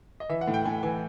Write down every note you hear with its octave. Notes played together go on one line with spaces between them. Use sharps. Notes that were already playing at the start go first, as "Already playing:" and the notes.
D#5
E3 E5
F#5
A2
G5
A2 G#5
E3 G#5